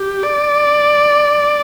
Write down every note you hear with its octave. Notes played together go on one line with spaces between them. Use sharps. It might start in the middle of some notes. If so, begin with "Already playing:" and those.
Already playing: G4
D5